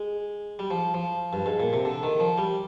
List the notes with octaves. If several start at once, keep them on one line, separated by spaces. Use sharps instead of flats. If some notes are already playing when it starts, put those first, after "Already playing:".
Already playing: G#3
G3
F3
F3
G2
G#2
A#2
C3
D3
D#3
F3
G3